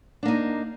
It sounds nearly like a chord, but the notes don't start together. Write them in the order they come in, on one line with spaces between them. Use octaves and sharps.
D4 A#3 D#4